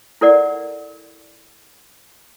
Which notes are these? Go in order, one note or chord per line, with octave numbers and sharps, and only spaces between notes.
E4 A4 A#4 D5 F#5